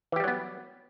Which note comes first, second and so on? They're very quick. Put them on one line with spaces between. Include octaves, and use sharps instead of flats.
E3 G4 G3 F#3 B3